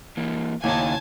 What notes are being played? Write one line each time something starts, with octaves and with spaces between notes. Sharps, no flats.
E3 A#3
D#2 C#3 D#4 E4 C#5 G#5 A5